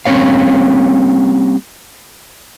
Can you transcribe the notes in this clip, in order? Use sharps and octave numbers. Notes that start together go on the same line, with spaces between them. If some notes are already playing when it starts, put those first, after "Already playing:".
G3 A#3 C4 C#4 C#5 F5